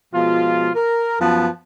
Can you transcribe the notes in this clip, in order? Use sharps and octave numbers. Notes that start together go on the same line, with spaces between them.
B2 F3 G#3 F4
A#4
F#2 F3 B3 A5